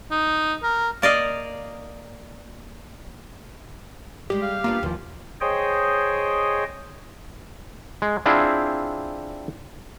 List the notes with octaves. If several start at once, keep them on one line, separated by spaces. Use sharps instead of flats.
D#4
A#4
A#3 D5 D#5 F5
G3 G#3 G4
F5
A#3 B3 D4 F4
D#2 E3 F3
G#4 C5 C#5 D#5 G5
G#3
C4 D4 E4 F4 G#4 C5